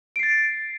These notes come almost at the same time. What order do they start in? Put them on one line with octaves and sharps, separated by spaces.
D7 C7 A6